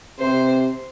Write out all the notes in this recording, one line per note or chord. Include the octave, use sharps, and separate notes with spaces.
C3 C5